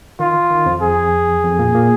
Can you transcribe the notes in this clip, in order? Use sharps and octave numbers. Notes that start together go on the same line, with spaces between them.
D#3 F4
D#3
F2 F3
G#4
F2 F3
A#2 A#3
A#2 A#3